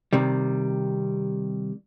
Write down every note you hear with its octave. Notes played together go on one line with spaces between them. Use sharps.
C3 D#3 G3